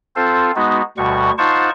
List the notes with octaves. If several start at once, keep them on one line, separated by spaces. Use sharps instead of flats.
C4 F4 A4 C5
G#3 B3 D#4 F#4
D2 B2 G3 F#4 C#6
D#4 F4 C5 F#5 A5 C#6